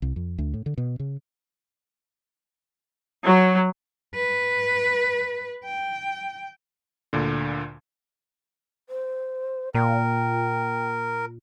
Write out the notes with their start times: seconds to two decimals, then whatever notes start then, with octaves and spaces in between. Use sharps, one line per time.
0.02 C2
0.16 F2
0.38 D2
0.54 A2
0.66 D3
0.78 B2
1.00 C#3
3.27 F#3
4.15 B4
5.64 G5
7.13 D2 A#2 D3
8.88 C5
9.75 A#2 A#4 G5